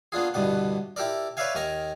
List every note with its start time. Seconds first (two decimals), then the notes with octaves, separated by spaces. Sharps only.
0.12 A#3 B3 D4 F4 G#4
0.34 C2 G2 B2 D3 B3 F#5
0.96 E4 G4 A4 A#4 D5
1.37 B4 C#5 D5 E5 F5 G#5
1.55 D#2 D#3 A#4 G#5 A#5